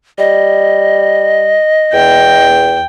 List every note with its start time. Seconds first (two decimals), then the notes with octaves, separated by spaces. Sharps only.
0.18 G3 D#5
1.93 E2 G5